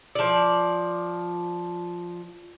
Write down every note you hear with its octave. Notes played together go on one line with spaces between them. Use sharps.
F3 D5